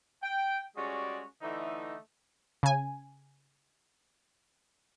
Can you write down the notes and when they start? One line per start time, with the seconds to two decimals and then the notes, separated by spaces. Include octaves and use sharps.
0.23 G5
0.77 G3 G#3 C#4 F#4 G#4 D5
1.42 D3 E3 A3 D#4
2.63 C#3 G#5